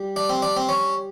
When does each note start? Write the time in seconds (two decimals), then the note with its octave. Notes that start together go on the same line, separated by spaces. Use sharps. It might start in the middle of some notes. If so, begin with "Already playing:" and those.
Already playing: G3
0.16 D4
0.29 C4
0.42 D4
0.57 C4
0.69 C#4